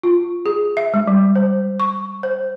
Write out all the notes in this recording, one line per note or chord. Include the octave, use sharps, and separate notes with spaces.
F4
G#4
E5
G#3
G3
C5
C#6
C5